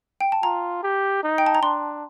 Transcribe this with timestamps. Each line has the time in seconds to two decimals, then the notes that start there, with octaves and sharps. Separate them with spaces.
0.21 G5
0.32 A5
0.43 F4 A#5
0.83 G4
1.24 D#4
1.38 G5
1.46 A5
1.55 A#5
1.62 D4 C6